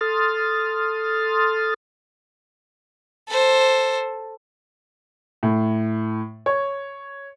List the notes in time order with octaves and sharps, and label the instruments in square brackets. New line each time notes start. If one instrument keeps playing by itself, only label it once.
[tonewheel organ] A4 C6 D#6 F6 A6
[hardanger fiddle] A4 C5
[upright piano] A2
C#5